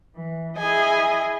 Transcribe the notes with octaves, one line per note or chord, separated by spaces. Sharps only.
E3
E4 G#4 D#5 G#5